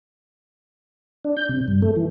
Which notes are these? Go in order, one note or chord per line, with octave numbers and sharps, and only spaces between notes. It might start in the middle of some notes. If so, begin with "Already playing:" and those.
D4
G6
C3
G2
A3
E3